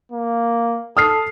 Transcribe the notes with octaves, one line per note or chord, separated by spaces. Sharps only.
A#3
A4 D#6 F6 C7